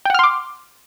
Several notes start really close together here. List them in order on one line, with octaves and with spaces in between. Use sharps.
G5 F#5 F6 C6 D6